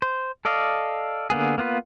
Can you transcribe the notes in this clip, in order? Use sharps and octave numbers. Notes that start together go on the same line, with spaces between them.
C5
A4 D5 D#5 F5
D3 A#3 B3 G#4
A#3 B3 F4 B4